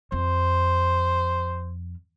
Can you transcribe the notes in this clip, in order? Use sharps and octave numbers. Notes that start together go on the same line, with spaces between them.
F2 C5